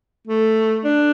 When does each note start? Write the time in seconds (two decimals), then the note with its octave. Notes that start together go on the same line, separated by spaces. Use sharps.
0.27 A3
0.84 D4